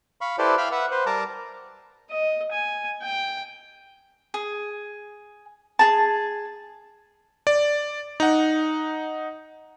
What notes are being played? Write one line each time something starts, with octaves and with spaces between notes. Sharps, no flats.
F5 B5 C#6
E4 G4 A4 B4 C5 D5
E5 F5 G5 B5 F6
B4 E5 F#5
B4 C5
G3 A#4 A5 A#5 D6
D#5
G#5
G5
G#4
G#4 A5
D5
D#4 F#5